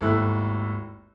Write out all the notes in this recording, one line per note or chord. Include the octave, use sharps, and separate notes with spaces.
G#1 D#2 A3 E4 F#6